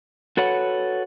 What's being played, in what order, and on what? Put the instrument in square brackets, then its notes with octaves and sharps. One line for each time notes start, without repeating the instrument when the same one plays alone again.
[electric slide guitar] F#4 A4 B4 C#5 F#5